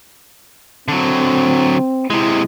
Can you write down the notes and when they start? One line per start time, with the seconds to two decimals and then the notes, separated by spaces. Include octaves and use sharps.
0.88 D3 F#3 C4
2.10 C3 G#3 E4